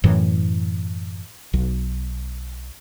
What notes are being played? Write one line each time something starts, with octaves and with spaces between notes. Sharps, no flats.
F#2 A2 E3
B1